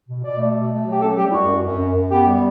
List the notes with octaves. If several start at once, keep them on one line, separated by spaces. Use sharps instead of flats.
B2
B2 D5
A3
B2
A3
F#3
G4
C#4 A4
G3 G4
E4
F#2 F#4
F#2
F#2
F#2
F#2
B3 G4
G3